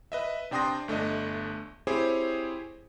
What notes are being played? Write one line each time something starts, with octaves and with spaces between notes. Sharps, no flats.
B4 D#5 E5
C3 D4 G5 C6 D#6 A#6
G1 A3 D4 D#5
C4 E4 G4 G#4 C5 C#5